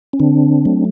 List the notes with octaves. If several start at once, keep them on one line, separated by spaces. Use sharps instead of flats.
C#4
D3 C4 D4
F#3 A3